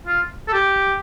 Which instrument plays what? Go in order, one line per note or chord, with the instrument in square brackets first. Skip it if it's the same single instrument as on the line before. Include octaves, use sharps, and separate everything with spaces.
[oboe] F4
A4
G4